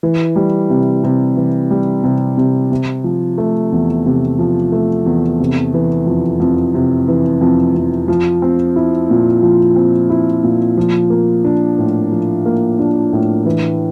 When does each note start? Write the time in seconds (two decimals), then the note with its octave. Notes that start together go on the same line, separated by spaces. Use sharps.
0.03 E3
0.36 G3
0.70 C3
1.04 C3
1.37 E3
1.71 G3
2.04 C3
2.37 C3
2.72 C3
3.04 F3
3.38 A3
3.72 E2
4.06 C3
4.39 F3
4.72 A3
5.06 E2
5.40 C3
5.74 E3
6.06 F2
6.40 F2
6.74 C3
7.08 E3
7.41 F2
7.75 F2
8.08 F3
8.42 C4
8.76 E4
9.10 A#2
9.42 F3
9.76 C4
10.10 E4
10.43 A#2
10.77 F3
11.10 A#3
11.45 D4
11.78 A2
12.12 F3
12.46 A#3
12.79 D4
13.13 A2
13.46 E3